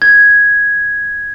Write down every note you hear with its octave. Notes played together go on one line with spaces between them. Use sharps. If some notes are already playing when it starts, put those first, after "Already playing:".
G#6